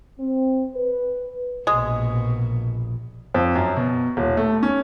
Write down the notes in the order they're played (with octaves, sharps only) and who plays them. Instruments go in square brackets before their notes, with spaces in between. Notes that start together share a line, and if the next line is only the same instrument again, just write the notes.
[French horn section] C4
B4
[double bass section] A#1 [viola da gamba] B2 [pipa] G#3 [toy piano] D#6
[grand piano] F2
F#2
B2
D#1
A3
C#4